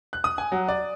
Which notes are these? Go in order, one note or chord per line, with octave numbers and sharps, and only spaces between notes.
F#6
D#6
G#5
F#3
D5